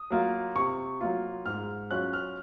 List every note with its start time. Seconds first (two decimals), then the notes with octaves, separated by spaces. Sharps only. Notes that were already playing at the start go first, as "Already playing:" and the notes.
Already playing: D#6
0.10 F#3 A#3 F4
0.55 C3 C#6
1.01 F#3 A#3 F4
1.46 G#2 F6
1.91 F#3 C#4 F4 F#6
2.13 F6